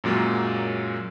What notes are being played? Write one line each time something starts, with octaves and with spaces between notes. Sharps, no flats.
F#2 A#2 F#3 G#3 A#3